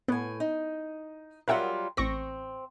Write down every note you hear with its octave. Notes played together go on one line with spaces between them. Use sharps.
A2 B3 G#5
D#4
F#3 G3 F4 A#4 E5 F#5
A1 C4 C#6 A#6